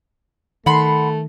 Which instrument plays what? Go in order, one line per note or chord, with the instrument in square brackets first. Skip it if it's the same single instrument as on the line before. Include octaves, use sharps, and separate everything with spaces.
[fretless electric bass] D#3 [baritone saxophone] A3 [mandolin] F#5 B5 C6